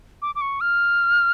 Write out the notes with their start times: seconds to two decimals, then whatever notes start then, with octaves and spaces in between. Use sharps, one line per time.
0.22 D6
0.35 D6
0.41 C#6
0.61 F6